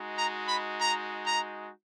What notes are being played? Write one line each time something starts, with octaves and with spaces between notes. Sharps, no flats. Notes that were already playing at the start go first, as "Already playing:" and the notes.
Already playing: G#3 D#4 F#4
A#5
B5
A#5
A#5